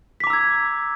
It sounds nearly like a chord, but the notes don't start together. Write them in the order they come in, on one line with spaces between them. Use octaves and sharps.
B6 D6 A#5 E6 G#6